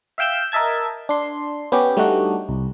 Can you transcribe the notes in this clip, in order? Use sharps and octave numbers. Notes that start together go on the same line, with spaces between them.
E5 F5 G5 E6 G6
A#4 D#5 E5 A5 G#6
D4 C6
B3 C#4 G4
G3 A3 D4 D#4 F#4
C2